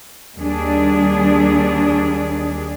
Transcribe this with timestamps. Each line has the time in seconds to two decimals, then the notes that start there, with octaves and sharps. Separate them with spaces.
0.37 D#2 G3 D4 G#4